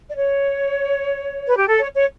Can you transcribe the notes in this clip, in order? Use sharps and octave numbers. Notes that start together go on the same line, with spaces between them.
D5
C#5
B4
G4
A4
C#5
C#5